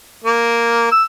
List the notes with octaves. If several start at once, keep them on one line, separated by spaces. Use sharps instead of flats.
A#3
E6